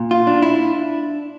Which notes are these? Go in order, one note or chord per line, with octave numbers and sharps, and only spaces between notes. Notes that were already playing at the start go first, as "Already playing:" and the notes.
Already playing: A#2
F4
D4
E4